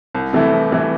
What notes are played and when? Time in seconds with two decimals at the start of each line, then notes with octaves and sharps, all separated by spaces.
0.15 C2
0.33 C3 E3 A3 E4
0.52 C2
0.72 C3 E3 A3 E4